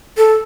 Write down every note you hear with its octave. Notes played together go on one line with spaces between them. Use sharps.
A4